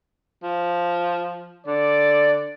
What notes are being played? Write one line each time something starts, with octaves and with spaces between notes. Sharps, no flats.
F3
D3 D5